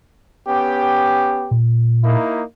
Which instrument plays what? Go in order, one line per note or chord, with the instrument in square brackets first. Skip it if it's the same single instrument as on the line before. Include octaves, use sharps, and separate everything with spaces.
[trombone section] B3 C#4 G4
[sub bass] A#2
[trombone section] A#3 D#4 E4